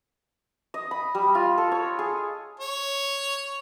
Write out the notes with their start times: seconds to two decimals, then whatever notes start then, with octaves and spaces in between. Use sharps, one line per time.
0.74 D#5
0.91 B5
1.15 G3
1.35 F4
1.58 A4
1.72 C#5
1.99 G#4
2.60 C#5